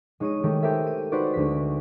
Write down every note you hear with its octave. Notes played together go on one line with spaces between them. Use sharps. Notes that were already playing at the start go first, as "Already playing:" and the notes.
G#3 D#4 C#5 D#6 C#7 D#7
D#3 G#3 A3 G4
G4 A4 A#4 C5 E5 G#5
D#7
D#4 F#4 B4 C5 D5
D2 G#3 B6